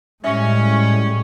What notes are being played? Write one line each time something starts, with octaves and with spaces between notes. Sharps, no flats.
A2 G3 G#3 C#4 E5